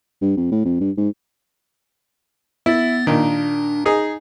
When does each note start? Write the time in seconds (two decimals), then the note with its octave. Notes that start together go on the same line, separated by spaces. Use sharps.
0.21 G2
0.37 F2
0.52 A2
0.65 F2
0.80 G2
0.97 G#2
2.66 B3 E4 A6
3.07 A#2 D#3 D4
3.86 D#4 G#4